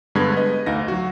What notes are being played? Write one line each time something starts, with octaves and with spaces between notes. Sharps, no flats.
G2 D3 G#3 B3 B5 G#6
B4 D#5
D2 D#4 F5 A#6
F#3 F#4